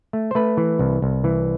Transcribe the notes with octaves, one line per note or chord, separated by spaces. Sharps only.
A3
C5
A3 B4
E3
C2
C2
E3